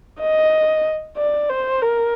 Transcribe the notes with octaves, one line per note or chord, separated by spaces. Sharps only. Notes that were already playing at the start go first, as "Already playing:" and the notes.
D#5
D5
C5
A#4